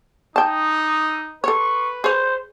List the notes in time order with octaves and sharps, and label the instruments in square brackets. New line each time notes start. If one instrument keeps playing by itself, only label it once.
[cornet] D#4 [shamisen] G5 A5 [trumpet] D#6
[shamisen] A4 C#5 [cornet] B4 [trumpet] C#6
[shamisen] G#4 C#5 [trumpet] C5